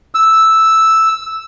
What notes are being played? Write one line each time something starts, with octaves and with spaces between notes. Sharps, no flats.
E6